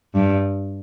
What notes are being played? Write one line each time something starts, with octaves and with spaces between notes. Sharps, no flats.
G2